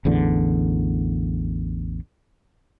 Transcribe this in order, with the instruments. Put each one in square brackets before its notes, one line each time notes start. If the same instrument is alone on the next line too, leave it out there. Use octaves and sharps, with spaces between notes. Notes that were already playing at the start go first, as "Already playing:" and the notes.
[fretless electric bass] A1 E2 D3